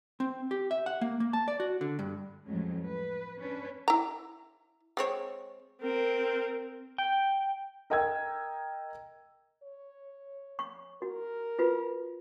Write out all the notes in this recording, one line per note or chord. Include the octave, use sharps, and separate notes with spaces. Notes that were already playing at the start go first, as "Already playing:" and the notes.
C4
G4
E5
F#5
A#3
A#3
A5
D5
F#4
D3
G2
F2 A2 F#3 G#3 C#4
B4
C#4 D4 B4
E4 A#5
G#3 C4 C#5
C4 A#4
G5
A#4 D#5 G5 E6 G#6
C#5
C#6
F#4 A#4
F4 F#4 B4